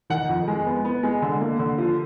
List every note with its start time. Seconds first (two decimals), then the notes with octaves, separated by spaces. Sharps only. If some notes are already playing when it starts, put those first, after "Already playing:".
0.10 D#3 F#5
0.29 F2
0.48 G#3
0.66 B3
0.85 B3
1.03 G#3
1.22 D3
1.41 A#3
1.59 D3
1.78 F3